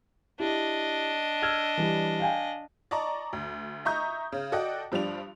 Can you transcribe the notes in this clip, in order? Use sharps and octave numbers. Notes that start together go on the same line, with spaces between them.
D4 E4 G4 D#5
E6 F6 G#6
E3 G3
F5 G5 G#5
D5 D#5 A5 A#5 C#6
D2
D#5 E5 A#5 C#6 D#6 G6
C#3
F#4 A4 D5 D#5 G5
G2 F3 G3 D4 F7